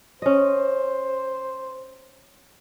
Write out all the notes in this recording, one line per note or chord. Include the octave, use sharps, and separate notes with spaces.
C#4 C5 D#5